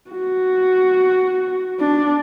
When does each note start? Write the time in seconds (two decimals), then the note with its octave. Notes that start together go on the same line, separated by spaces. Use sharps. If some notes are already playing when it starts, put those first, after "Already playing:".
0.10 F#4
1.80 D4